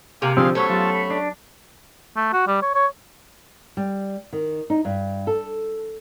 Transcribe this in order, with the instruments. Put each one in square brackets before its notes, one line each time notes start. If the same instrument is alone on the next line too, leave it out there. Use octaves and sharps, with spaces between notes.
[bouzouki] C3 [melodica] A#3 G#5 D6
[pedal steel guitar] D3 F3 C4 [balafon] G4 [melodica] G#4 F5 C6
[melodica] F#3 C#5 [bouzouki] A3 B3 C#4 [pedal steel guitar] A4 [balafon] C5
[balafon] F#3 G4 C#6 [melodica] F4 A5
[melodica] B5
[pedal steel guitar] D4
[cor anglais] A3
F#4
G3
C#5
C#5
[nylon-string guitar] G3
D#3
D#4
G2
A4